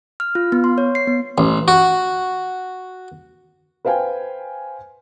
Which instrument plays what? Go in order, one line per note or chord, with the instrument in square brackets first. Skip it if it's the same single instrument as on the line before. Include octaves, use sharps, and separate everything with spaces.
[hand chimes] F6
F4
B3
C6
C#5
C7
B3
[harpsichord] A1
F#4
[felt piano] B4 C5 F5 G5 G#5